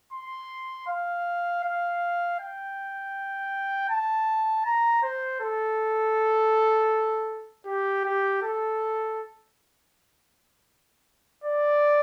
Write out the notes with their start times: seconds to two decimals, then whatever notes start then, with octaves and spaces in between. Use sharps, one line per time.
0.13 C6
0.87 F5
1.64 F5
2.39 G5
3.89 A5
4.65 A#5
5.03 C5
5.40 A4
7.66 G4
8.04 G4
8.42 A4
11.44 D5